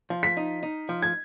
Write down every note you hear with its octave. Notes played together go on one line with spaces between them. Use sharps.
F3
B6
D#4
D#4
F3
G#6